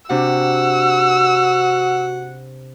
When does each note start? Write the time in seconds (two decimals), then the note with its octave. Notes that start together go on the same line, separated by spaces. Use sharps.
0.10 C3 D4 F#4 F#5 E6